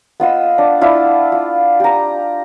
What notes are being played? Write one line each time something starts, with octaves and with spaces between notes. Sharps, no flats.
B3 F4 D#5 E6
D4
D4 E4 F4
F4
G4 A#5